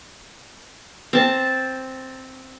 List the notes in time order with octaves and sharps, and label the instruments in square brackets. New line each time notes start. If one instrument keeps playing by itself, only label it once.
[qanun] C4 A5